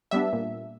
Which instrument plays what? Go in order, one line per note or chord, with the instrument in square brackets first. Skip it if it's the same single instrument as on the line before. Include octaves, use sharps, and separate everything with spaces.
[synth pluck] G3 B3 D4 E5
A#2